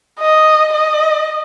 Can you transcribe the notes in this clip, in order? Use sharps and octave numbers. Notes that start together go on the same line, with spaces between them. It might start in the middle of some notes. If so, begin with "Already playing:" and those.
D#5
D#5